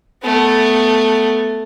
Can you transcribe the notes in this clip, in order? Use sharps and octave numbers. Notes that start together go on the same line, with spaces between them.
A3 B3